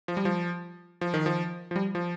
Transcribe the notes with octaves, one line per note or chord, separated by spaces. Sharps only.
F3
G3
F3
F3
D#3
F3
F3
G3
F3